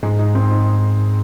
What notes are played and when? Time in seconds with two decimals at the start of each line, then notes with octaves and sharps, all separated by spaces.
0.03 G#2 G#3
0.19 D#4
0.35 C4
0.51 D#4